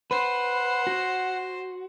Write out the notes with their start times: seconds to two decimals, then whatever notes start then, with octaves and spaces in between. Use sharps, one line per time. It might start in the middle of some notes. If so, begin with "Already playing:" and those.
0.11 B4 C5 F#5
0.87 F#4